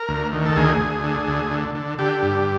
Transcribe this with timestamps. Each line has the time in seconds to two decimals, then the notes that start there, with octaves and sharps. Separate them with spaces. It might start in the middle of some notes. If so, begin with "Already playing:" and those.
Already playing: A#4
0.09 D2
0.33 D#3
0.45 A4
0.56 D2 G#4
0.80 D2
1.04 D3
1.27 D2
1.51 D3
1.75 D3
1.99 D3 G4
2.22 G2